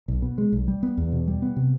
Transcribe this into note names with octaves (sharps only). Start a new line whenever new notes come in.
B1
B2
G#3
B1
G3
B3
E2
B2
G3
B3
C3